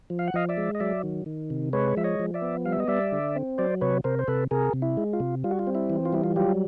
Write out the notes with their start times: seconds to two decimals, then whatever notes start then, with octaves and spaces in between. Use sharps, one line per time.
0.10 F3
0.19 F5
0.28 F#5
0.34 F3 D#5 F5
0.49 D5 E5
0.57 G#3
0.75 D#5
0.80 F#3 D5 E5
1.03 D#3
1.26 D#3
1.50 C3
1.73 G#3 B4 C#5
1.97 F3 E5
2.04 C#5 D#5
2.19 F3
2.34 D5 E5
2.42 B3
2.65 G3 F5
2.72 E5
2.80 D#5
2.88 G3 D5 E5
3.12 D3
3.36 C4
3.58 F#3 C5 D5
3.81 C3 B4 C#5
4.04 C3 A#4 C5
4.19 C5
4.28 C3 A4 B4
4.51 C3 G#4 A#4
4.74 C3
4.82 E4
4.97 G#3
5.13 F4
5.20 C3
5.44 G3 F4
5.51 F#4
5.59 F4
5.67 C4
5.75 E4
5.90 E3
6.05 F4
6.13 G3 E4
6.24 F4
6.36 F#3 F4 G4